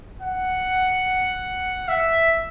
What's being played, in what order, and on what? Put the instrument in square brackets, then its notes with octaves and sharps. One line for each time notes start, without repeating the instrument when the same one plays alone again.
[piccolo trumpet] F#5
E5